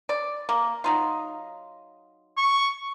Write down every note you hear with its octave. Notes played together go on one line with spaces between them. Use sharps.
D5
A#3
F#3 D#4 F4
C#6